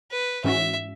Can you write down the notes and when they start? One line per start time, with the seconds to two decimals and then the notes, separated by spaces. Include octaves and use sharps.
0.11 B4
0.44 G#2 E3 C#4 F#4 E5